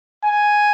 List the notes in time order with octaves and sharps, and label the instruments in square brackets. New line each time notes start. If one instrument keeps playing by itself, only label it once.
[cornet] G#5